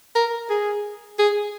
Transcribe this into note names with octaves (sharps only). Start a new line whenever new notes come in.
A#4
G#4
G#4